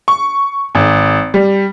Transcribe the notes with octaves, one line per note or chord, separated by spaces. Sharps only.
C#6
G#1
G3